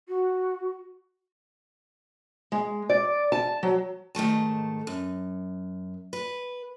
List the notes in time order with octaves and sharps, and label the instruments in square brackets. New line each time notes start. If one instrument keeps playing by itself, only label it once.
[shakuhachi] F#4
[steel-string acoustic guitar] G#3
D5
A5
F#3
G#2 D#3 A3 A5
F#2
B4